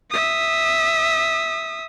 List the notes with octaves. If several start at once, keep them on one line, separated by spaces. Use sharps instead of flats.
E5 D#6